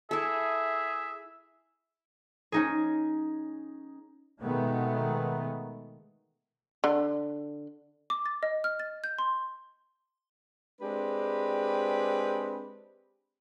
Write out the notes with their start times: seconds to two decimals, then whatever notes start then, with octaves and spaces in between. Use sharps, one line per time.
0.11 E4 G#4 A4 E5
2.52 C#4 D#4 G#4
4.43 B2 D#3 G#3 A3 B3
6.84 D3
8.10 D6
8.26 A6
8.43 D#5
8.64 F6
8.80 A6
9.04 G6
9.19 C6
10.80 G#3 C4 D4 G4 B4